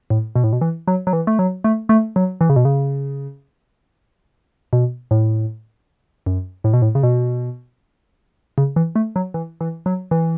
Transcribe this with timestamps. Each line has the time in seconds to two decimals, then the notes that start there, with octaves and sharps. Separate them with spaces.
0.10 A2
0.36 B2
0.44 A2
0.53 B2
0.61 E3
0.88 F#3
1.07 F#3
1.13 E3
1.27 A3
1.39 F#3
1.64 A3
1.89 A3
2.16 F#3
2.41 E3
2.50 C#3
2.56 B2
2.65 C#3
4.73 B2
5.11 A2
6.26 F#2
6.64 A2
6.73 B2
6.82 A2
6.95 C#3
7.03 B2
8.58 C#3
8.76 E3
8.96 A3
9.16 F#3
9.34 E3
9.61 E3
9.86 F#3
10.11 E3